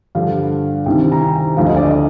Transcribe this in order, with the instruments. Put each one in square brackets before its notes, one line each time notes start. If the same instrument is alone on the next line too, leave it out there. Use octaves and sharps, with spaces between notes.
[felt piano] G2 D3 F3 F5
C2 C3 D#3 G5
A#5
G#5
D2 D3 F3 F5
D#5
D5
D#5